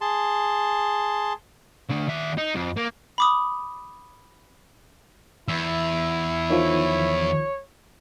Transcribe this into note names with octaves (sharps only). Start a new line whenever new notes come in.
G#4 A5 C6
D3 A3
D#2 E5
D#4
F2
A#3
B5 D6 D#6
E2 E4 E6
D#3 F3 C#5